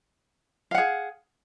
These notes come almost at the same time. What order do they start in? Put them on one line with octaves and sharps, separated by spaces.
F5 F#5 G#4